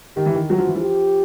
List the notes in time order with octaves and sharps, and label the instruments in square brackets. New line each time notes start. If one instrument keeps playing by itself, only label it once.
[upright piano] D#3 [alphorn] G4
[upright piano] E3
D#3
[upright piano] F#3 [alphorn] F#4
[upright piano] F3
E3
F3
[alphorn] G4